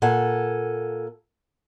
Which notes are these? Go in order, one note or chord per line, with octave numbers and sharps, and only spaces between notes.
A#2 A4 F#5 G#5